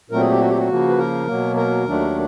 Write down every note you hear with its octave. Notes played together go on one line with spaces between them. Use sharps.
A#2 F#3 A3 C4 A#4
G#4
G4
F#4
G4
F#4
C#3 F3 A#3
B4
A#4
B2 F#3 A#3
A#4
D#2 D#3 F#3 A3 D4